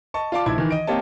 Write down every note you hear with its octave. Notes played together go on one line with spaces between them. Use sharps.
D#5 A5 C#6
F4 D5 F5 A5 D6
A#1 D#4 E4 A5 G#6
D#3 E3
D#5 D7
A#3 C4 G4 C#5 D#5 A5